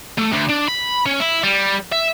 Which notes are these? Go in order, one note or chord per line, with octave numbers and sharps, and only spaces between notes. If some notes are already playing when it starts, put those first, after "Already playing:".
A3
D2
D4
B5
C#4
E4
G3
E5